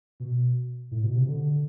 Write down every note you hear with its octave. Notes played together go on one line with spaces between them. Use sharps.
B2
A2
B2
C3
D3